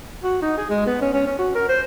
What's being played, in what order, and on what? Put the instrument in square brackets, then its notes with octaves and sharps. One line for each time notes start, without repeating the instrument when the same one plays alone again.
[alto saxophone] F#4
D#4
G#4
G#3
B3
C#4
C#4
C#4
F#4
A#4
C5